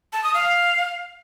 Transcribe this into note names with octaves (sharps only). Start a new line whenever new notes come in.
A5
D#6
F5